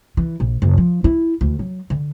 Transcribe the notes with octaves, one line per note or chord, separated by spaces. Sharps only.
E3
A#1
F#1
F3
E4
D2
F#3
D3